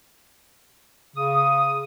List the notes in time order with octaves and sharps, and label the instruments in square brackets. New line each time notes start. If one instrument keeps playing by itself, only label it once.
[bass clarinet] C#3 [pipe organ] D#6